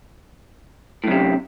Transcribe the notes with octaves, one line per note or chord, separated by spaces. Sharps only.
F#2 A2 C3